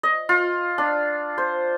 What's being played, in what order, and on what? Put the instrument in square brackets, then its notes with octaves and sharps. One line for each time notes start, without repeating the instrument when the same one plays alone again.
[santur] D#5
F4
D4
C5